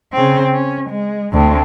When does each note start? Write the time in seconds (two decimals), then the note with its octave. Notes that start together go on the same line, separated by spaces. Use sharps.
0.13 C#3 C4
0.53 C#4
0.89 G#3
1.33 D2 C4